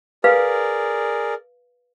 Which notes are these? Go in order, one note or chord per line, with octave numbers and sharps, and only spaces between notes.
G#4 A#4 B4 D5 F5